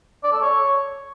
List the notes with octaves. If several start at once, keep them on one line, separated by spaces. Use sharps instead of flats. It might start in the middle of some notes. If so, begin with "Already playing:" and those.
D5
A4
C#5